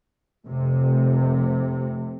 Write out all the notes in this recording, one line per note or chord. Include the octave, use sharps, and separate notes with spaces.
F1 C3